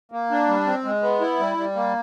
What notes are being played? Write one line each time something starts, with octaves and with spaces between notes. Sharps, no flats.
A#3
D4
G3
C4
G#3
B3
E4
G3
G3
A#3